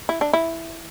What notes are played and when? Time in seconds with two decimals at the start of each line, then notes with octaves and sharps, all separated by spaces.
0.09 E4
0.21 D4
0.33 E4